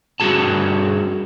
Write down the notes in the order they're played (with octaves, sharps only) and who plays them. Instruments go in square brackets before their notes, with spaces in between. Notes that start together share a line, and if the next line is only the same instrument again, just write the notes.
[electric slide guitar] G2 F3 F#4 G#4 A5